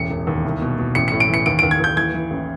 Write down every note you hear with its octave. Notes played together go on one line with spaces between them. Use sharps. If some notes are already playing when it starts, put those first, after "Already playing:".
Already playing: E1 A1 C#7
E1
D#2
C2
B2
B2
A1 C#7
A2 C#7
D7
E3 C#7
D#2 D7
D#2 D7
G#6
D#2 G6
E3 G#6
E3
A1